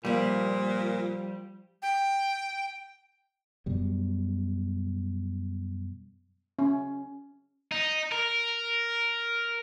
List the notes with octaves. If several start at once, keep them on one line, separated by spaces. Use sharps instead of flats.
A#2 F3 G3 A#3
G5
F#2 B2 G3
C#4
D#4
A#4